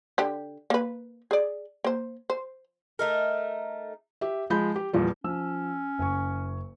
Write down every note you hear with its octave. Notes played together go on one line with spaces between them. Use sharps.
D3 G4
A#3 B4
G#4 D5
A#3 C5
C5
A3 D#4 A#4
G4 E5
F3 G#3 B5 G6
G4
E2 A#2 F3 G3
F3 C#4 E6
F#1 G#5 C#6